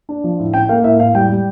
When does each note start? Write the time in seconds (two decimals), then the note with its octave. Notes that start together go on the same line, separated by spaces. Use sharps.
0.09 D4
0.24 F3
0.40 A2
0.54 C#4 G5
0.69 A#3 F5
0.84 A2 E5
0.99 A2 F5
1.14 G3 G5
1.29 G3